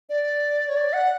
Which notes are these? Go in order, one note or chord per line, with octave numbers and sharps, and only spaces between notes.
D5
C#5
D5
F#5